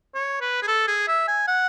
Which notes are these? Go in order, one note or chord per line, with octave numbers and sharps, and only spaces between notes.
C#5
B4
G#4
A4
G#4
E5
G#5
F#5